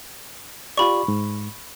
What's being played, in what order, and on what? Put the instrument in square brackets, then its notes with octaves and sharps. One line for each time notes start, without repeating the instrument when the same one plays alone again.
[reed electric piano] F4 G4 D5 [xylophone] B5 C#6
[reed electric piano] G#2